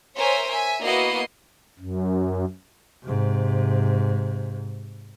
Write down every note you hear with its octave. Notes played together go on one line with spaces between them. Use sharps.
A#4 C5 C#5 E5 G#5
E5 G#5
A#3 B3 E4 F#4 D#5 C7
F#2
G#2 C3